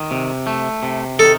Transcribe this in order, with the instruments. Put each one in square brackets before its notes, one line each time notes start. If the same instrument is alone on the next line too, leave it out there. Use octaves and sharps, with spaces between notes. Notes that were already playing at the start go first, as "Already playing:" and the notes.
Already playing: [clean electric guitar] D#3
C3
A3
C3
[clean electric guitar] D#3 [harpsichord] A4